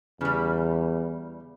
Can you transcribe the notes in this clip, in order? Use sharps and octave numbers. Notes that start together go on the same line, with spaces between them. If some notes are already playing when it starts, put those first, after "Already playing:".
E2 C#3 G3